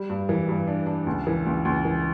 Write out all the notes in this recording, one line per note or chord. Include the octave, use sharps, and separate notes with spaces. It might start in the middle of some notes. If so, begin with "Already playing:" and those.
Already playing: G3
G2
E3
G2
D4
D4
C#2
E3
C#2
C#2
E3